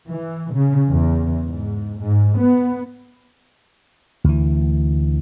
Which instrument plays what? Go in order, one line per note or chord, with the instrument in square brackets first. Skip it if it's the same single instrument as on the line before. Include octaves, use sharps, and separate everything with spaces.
[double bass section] E3
C#3
E2
G#2
G#2
B3
[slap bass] D2 E3